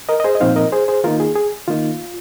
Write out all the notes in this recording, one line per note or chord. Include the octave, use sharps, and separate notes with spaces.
A#4 D#5
D#5
G#4 C5
D#5
A#2 F3 C4 D#4 C5 F5
A#4 D#5
G#4 C5
G#4 C5
D#3 A#3 D#4 F4 A#4
G#4
G#4
D#3 A#3 D#4 F4